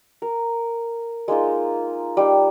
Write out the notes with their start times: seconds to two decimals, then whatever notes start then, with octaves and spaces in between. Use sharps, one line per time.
0.22 A#4
1.28 G#3 A#3 D#4 F4
2.17 G3 D#4